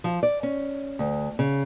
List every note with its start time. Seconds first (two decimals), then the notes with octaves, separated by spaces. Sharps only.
0.04 F3
0.23 D5
0.43 C#4
0.99 D2
1.39 C#3